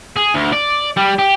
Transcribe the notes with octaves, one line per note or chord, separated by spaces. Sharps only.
G#4
D2
D5
G3
G4